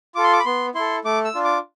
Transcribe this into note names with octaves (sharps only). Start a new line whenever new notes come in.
F4 A4 D6
C6
D6
B5
B3 C6
E4 A4 C6
A3 D6
E6
D4 F4
D6